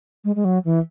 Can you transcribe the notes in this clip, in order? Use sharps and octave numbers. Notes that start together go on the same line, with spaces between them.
G#3
G#3
F#3
E3